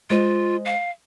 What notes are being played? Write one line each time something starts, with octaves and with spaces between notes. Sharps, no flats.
G#3 F4 C5 D#5
F5